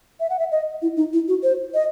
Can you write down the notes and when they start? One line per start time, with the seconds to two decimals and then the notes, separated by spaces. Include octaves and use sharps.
0.20 E5
0.30 F#5
0.39 E5
0.52 D#5
0.82 E4
0.97 D#4
1.13 E4
1.28 F#4
1.43 C5
1.74 D#5